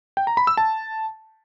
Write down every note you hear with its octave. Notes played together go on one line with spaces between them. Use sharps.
G5
A#5
B5
E6
A5